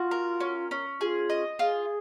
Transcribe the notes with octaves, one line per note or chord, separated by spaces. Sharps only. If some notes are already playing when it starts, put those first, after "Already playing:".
Already playing: F4 F#4
A#4
C#4
C#4
F4 G#4
D#5
F4 G#4